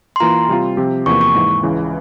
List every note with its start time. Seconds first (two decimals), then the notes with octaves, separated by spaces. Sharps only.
0.16 C6
0.20 E3 A#3 F4 A#5
0.48 C3 G3 C4 F4
0.77 C3 F3 C4 G4
1.06 E2 C3 F3 A#3 C#6
1.21 C#6
1.35 G#2 E3 A#3
1.63 C#2 C#3 E3